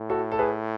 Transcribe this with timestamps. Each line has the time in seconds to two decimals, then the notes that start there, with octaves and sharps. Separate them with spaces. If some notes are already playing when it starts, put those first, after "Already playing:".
Already playing: A2
0.10 F#4 A4
0.32 A4
0.39 G#4 B4